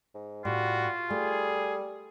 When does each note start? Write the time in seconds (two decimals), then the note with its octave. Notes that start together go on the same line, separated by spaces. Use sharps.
0.14 G#2
0.45 A2 G3 F4 F#4
1.10 G3 A3 G#4